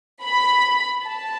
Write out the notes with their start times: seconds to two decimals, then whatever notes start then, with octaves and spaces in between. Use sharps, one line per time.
0.25 B5
1.07 A5